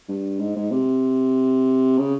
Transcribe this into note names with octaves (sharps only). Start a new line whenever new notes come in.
G2
G#2
G#2
C3
C#3